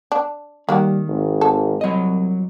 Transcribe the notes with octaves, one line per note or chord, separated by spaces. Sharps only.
D4
D#3 G3 A#3 F#4 G4
G#1
A4
C2 F#3 D#5